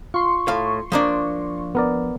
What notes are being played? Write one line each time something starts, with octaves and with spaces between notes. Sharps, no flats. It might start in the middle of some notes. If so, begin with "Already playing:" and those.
F4 C6 C#6
A2 F5
F3 A#3 D4
B3 A#4 D5